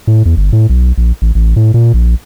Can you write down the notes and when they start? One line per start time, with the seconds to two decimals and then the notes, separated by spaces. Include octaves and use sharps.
0.07 A2
0.26 E2
0.37 G1
0.53 A2
0.69 B1
0.98 A#1
1.22 A1
1.35 A1
1.56 A2
1.74 A#2
1.94 A#1